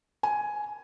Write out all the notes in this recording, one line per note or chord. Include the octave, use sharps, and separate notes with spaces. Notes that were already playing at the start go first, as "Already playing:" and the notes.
G#5